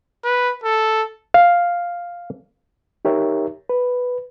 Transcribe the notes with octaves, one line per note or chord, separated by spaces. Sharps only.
B4
A4
F5
D#4 G4 A#4 C#5 E5
B4